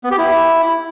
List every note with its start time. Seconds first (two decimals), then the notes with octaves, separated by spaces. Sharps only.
0.04 B3
0.11 G4
0.18 E4